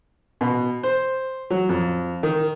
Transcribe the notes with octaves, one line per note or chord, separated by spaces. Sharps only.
B2
C5
F#3
F2
D#3